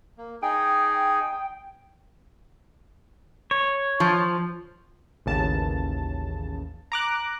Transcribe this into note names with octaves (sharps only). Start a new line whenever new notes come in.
A#3
D#4 G#4 G5 G#5
C#5
F3
A1 D#2 C#3 A5
A#5 D6 F#6